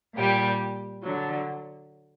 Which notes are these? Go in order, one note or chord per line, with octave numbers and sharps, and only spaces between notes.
A#2 G3 G4
D3 F#3